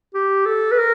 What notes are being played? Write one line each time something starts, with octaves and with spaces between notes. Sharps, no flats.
G4
A4
B4
A#4